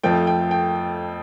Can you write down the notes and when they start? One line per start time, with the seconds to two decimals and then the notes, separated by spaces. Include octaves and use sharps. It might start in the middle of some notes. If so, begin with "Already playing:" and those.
0.04 F2 F3 A3 G5
0.27 G5
0.51 G5